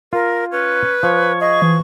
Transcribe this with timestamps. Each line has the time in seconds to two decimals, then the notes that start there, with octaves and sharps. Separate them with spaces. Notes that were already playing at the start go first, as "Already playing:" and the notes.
0.13 F4 A#4
0.52 C#4 B4
1.03 F3 C#5
1.41 G#4 D#5 C#6
1.62 E3